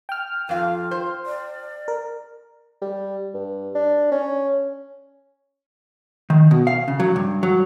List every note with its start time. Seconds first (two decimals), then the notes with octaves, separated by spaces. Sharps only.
0.09 G5 F6
0.49 F2 F4 F5
0.91 C5
1.26 D5
1.88 A#4
2.81 G3
3.34 G2
3.75 D4
4.12 C#4
6.30 D#3
6.51 B2
6.67 F5
6.88 C#3
7.00 F#3
7.16 G2
7.43 F#3